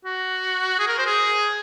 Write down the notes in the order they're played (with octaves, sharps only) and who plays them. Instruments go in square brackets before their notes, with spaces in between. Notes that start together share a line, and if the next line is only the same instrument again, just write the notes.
[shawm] F#4
G#4
A#4
C5
G#4